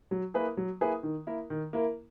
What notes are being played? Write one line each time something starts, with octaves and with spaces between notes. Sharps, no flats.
F#3
A#3 E4 G#4 B4
F#3
A#3 E4 G#4 B4
D#3
A#3 E4 A#4
D#3
A#3 E4 A#4